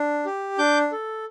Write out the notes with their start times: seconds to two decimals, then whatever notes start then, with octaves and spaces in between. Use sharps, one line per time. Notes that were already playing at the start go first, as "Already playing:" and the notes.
Already playing: D4
0.25 G4
0.58 D4 D6 G6
0.92 A4